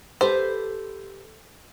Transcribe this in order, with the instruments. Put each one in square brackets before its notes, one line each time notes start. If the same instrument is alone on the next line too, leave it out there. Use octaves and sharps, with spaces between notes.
[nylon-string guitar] G4 A4 B4 [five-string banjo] C5